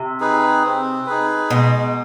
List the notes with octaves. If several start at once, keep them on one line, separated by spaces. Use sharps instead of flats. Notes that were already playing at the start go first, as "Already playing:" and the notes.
Already playing: C3
D#4 G#4 B4
C4
D#4 G#4 B4
B2 G#3